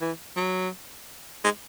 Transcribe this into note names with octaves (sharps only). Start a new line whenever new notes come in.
E3
F#3
G#3